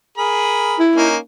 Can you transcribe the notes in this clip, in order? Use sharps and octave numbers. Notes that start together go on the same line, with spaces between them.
G#4 A#4 B5
E4
A#3 C#4 D#4